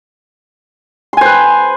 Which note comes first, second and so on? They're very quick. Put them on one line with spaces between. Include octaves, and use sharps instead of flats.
C6 G#5 C5 B4